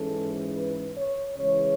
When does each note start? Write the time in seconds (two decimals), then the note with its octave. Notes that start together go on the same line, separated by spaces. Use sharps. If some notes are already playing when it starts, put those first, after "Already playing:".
Already playing: G#2 E3 G#3 C#4 A4
0.52 B4
0.95 C#5
1.36 C#3 E3 G#3 C#5